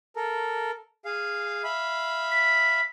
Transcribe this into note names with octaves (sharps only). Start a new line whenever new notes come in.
A4 A#4
G#4 F5
E5 F5 B5
B6